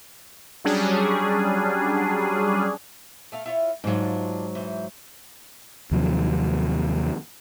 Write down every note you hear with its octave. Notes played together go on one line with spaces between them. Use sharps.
F#3 G3 C#4 D4 G#4
A3 A4 F5
E4 F4 C#5
G#2 F#3 D4 F4
E3 C5
D#2 C3 F3 F#3